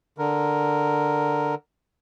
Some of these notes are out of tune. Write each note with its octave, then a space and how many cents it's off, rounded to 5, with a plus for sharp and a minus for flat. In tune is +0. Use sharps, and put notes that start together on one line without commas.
D3 +5 A#4 +0